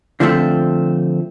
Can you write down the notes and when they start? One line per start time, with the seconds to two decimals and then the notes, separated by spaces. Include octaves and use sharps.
0.20 D3 F3 A3 C4